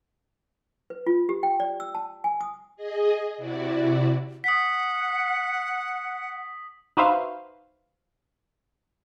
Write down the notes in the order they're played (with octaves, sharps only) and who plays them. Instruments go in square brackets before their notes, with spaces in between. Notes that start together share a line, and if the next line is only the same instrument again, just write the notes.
[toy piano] B4
F4
G4
G5
D5
E6
A5
G#5
D#6
[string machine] G#4 D#5
C3 E4 F#4 D5
[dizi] F#5 [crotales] D#6 B6
[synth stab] D#4 F#4 B4 C5 E5 F5